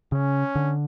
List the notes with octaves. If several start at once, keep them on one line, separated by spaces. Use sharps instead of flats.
C#3 C#4
D3